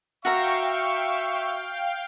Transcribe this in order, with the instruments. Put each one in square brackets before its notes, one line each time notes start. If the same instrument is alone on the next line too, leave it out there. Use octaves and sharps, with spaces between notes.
[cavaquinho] F#4 A#4 A#5 [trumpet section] E5 C#6 [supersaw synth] F5 G5